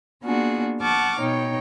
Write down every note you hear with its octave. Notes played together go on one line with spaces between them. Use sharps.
A#3 B3 D4 F4 F#4 G#4
F#5 A5 C#6 D6 F6
B2 D#4 C#5 G5